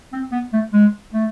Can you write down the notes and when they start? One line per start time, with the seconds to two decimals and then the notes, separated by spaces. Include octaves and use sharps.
0.13 C4
0.32 B3
0.53 A3
0.73 G#3
1.13 A3